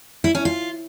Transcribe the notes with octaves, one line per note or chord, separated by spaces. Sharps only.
E4
C#4
F4